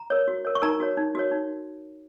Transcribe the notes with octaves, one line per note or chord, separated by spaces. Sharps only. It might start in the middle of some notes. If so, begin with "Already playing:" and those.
Already playing: A#5
A#4 C#5
F#4
A#4 C#5
C#6
D#4 A#4 A#5
F#4 A#4 C#5
D#4
F#4 A#4 C#5
D#4